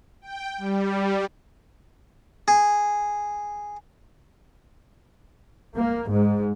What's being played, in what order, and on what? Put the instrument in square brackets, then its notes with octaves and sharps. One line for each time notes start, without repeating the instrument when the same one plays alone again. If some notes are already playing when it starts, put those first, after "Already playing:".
[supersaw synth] G5
G3
[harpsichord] G#4
[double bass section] A#3
G#2